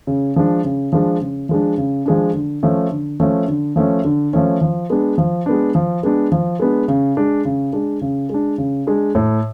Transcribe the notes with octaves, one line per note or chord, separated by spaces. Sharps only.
C#3
F3 G#3 D4
C#3
F3 G#3 D4
C#3
F3 G#3 D4
C#3
F3 G#3 D4
D3
F3 A3 C#4
D3
F3 A3 C#4
D3
F3 A3 C#4
D3
F3 A3 C#4
F3
G#3 B3 D4
F3
G#3 B3 D4
F3
G#3 B3 D4
F3
G#3 B3 D4
C#3
G#3 D4
C#3
G#3 D4
C#3
G#3 D4
C#3
G#3 D4
A2